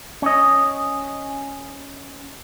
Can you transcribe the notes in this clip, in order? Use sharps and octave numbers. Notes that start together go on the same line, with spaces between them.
C#4 D#5